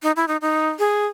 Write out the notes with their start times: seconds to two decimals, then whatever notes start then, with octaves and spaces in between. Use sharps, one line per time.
0.03 D#4
0.16 E4
0.28 D#4
0.41 D#4
0.79 G#4